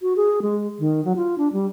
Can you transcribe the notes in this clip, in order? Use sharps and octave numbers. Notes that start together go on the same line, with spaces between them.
F#4
G#4
G#3
D#3
F#3
F4
D4
G3